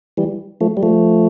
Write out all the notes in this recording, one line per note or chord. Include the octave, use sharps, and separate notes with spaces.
E3 G3
F3 A3
G3
F3 A3